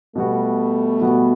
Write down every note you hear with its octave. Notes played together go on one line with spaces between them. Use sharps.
B2 G3 A3 B3 F#4
B2 G3 B3 F#4